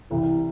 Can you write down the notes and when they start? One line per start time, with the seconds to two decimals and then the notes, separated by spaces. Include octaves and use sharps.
0.10 C2 C3 E3